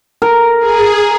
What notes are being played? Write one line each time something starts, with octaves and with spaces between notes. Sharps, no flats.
A#4
G#4